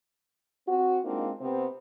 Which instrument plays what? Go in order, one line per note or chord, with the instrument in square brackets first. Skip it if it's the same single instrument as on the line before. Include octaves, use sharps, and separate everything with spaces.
[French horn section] C4 F#4
G#3 A#3 C4 D4 D#4 F4
C3 B3 C4